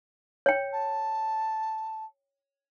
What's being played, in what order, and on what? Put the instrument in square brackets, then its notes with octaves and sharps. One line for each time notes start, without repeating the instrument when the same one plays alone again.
[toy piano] C#5 G5
[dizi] A5